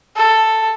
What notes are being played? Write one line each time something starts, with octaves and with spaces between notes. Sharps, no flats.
A4